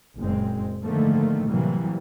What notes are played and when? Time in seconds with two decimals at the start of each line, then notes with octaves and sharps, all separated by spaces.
0.19 F#1 A#2 G#3 C4
0.84 G#2 D3 D#3 F3 A3 A#3
1.48 A2 C3 E3 F#3 G3 A#3